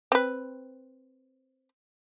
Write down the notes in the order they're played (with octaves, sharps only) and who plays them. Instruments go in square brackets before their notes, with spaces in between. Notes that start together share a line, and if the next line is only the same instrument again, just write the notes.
[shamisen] C4 B4